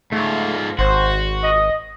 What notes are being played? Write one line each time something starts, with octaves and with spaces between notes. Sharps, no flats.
G#2 A3 F4
G#1 F#4 C5
D#5